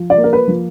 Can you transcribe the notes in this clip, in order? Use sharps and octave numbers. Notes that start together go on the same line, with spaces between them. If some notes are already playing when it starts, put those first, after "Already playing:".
Already playing: F3
D5
A#3
A#4
B4
F3